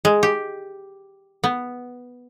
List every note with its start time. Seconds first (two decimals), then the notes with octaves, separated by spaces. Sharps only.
0.05 G#3
0.23 G4
1.44 B3